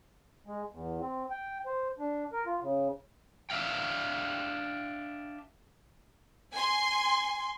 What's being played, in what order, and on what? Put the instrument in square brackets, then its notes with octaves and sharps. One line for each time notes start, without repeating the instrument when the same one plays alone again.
[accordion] G#3
E2
C4
G5
C5
D4
A#4
F4
C#3
[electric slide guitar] D4 E5 F5 G5
[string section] G#5 C6